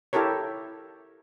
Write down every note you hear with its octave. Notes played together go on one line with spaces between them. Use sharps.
E4 G4 A4 A#4 C#5